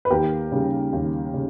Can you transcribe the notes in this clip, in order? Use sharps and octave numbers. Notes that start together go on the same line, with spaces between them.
B4
D#2 G4 A#4
C#3 G3
D#2
C#3